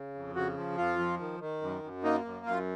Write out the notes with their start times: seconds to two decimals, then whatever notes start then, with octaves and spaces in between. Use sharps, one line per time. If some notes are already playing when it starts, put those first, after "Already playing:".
Already playing: C#3
0.15 F2
0.35 C#3 F#4
0.57 F3
0.77 F2 F4
0.99 F3
1.20 D#3
1.40 D#3
1.62 F#2
1.83 F#2
2.04 A#3 D#4
2.25 F#2
2.46 F#2 F4